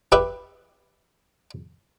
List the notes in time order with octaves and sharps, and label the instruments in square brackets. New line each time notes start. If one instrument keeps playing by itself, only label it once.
[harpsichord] G4 B4 E5